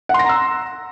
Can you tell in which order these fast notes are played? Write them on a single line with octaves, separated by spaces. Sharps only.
F#5 C6 A#6 A#5 E6